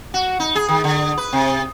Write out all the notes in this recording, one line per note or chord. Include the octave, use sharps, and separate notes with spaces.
F#4
D#4
G#4
D#3
D3
B4
C3